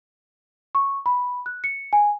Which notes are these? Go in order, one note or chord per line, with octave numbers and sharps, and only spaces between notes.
C#6
B5
F#6
C#7
G#5